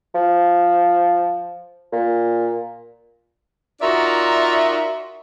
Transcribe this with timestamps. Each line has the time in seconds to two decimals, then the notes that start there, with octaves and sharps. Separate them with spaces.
0.15 F3
1.92 A#2
3.81 D#4 F4 F#4 A#4 D5 E5